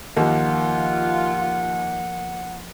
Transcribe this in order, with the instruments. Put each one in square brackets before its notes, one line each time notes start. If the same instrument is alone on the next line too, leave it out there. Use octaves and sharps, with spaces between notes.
[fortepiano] D#2 [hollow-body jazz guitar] F3 A#3 [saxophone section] F4 [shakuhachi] F#5